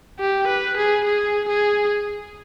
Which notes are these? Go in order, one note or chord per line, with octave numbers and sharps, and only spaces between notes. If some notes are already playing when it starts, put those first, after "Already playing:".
G4
B4
G#4
G#4
G#4